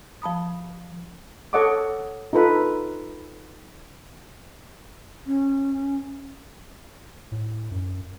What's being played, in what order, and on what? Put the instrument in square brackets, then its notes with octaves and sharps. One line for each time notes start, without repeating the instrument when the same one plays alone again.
[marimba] F3 A5 B5 D#6
[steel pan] A4 C#5 D#5 F#5 C#6 D6
D#4 F4 A4 B4 B5
[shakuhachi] C#4
[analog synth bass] A2
F#2